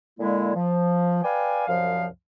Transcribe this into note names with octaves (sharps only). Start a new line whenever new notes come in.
A#2 D3 G#3 A#3 E4
F3
B4 D5 F5 G5 G#5
C2 F#2 F3 F5